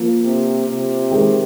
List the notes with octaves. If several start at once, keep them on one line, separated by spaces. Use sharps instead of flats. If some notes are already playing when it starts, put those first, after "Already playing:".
Already playing: F3 A#3
C3
C3
D#3 G#3